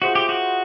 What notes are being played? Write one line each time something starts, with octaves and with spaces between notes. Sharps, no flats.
F4 F#4 G#4 C5 E5
G4
F#4